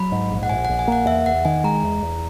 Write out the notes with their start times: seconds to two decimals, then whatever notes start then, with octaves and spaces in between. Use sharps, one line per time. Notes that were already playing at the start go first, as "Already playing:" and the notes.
Already playing: F#3 B5
0.12 G#2
0.31 A#1
0.43 F#5
0.50 A#1 G#5
0.65 A#1 F#5
0.79 G#5
0.88 A#3 F#5
1.07 E2 E5
1.26 E2 F#5
1.45 D#3 G#5
1.64 G#3 A#5
1.83 E2
2.02 E2